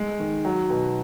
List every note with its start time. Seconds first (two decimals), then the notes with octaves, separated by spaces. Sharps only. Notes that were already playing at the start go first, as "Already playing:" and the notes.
Already playing: G#3
0.20 D#3
0.45 F#3
0.70 B2